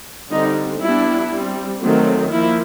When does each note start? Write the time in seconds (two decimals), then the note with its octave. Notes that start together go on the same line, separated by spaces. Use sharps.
0.31 D3 G3 C4 D#4
0.81 G3 B3 D4 E4
1.31 G3 C4
1.81 D#3 F#3 A3 C4
2.31 F3 A#3 E4